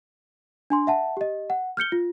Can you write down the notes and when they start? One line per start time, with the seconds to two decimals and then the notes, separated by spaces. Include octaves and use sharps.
0.70 D4 G#5 C6
0.87 E5 F#5 A5
1.17 G4 D#5
1.50 F#5
1.77 F6 G6 C#7 G7
1.92 F4